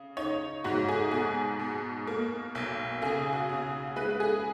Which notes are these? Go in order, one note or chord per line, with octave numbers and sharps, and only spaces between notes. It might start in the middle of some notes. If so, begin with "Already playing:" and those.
Already playing: C#3
D#4 C#5
G#2 F#4
G#4
B2 G#4
B2
A#3
B1
C#3 G#4
F#4
C#3
G#3 B4
G#4